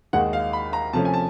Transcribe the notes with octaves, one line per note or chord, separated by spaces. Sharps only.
D#2 D#3 G#3 F#5
F5
B5
A#5
C3 F3 A3 C#4 A5
G#5
A5